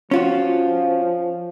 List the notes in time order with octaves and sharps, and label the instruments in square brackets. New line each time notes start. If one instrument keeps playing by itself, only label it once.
[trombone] F3 [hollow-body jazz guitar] C#4 F4 F#4